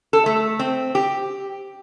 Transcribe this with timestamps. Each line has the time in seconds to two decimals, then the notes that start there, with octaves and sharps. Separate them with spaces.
0.13 A4
0.26 A3
0.59 C4
0.95 G4